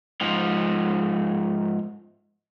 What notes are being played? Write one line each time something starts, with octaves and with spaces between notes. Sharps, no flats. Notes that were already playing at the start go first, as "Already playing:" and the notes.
G#2 F3